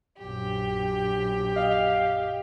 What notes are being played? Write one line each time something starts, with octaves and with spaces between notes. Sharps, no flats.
A#1 F#2 G4
D#5 F5